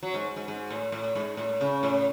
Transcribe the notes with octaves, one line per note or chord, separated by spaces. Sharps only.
F#3
G#2
G#2
G#2
A2
A2
G#2
A2
C#3
A2